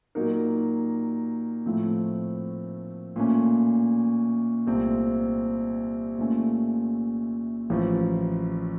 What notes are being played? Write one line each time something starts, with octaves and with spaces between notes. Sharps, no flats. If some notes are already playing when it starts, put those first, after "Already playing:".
A#2 F#3 A#3 D#4 A#4
A2 F3 A3 C4
A#2 A3 C#4
C2 A#2 A3 C4
A#2 A3 C#4
A1 A2 F3